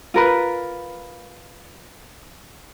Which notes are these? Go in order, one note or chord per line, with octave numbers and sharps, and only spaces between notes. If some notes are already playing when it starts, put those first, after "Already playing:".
F4 A#4 B4